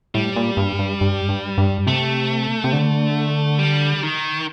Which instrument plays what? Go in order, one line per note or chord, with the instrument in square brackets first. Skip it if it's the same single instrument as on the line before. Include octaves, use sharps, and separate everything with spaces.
[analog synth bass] A2 [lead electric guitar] G3
[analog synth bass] A#2
G2
G2
G2
G2
G2
[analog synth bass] C3 [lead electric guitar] A3
[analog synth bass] C3
D3
[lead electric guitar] G3
D#3